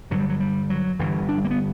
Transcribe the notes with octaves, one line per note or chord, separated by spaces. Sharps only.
G1 G2 D3 F#3
G3
F#3
G3
F#3
G1 G2 D3 E3
D4
G3
A#3
B3